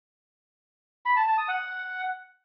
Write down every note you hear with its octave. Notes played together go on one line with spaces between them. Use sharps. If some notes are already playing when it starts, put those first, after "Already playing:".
B5
A5
A5
D#6
F#5